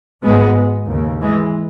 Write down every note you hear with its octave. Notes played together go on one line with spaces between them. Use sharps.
G#1 G#2 G#3 B3
D#2 C#3
E3 G#3